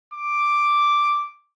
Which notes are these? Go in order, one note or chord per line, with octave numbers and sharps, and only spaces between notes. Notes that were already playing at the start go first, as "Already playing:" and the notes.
D6